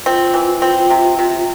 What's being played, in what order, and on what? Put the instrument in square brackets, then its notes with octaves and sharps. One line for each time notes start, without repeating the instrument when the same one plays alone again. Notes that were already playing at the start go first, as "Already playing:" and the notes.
[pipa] C4 [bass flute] F4
[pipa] E3
C4
C3
C3